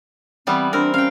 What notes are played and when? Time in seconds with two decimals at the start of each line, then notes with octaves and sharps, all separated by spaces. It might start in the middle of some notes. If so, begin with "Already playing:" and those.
0.47 E3 G3 B3 C4
0.73 C4 D4 A#4
0.94 C#4 F5 G5